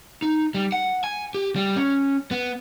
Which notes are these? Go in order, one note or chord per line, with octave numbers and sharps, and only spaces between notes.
D#4
G3
F#5
G#5
G4
G3
C#4
B3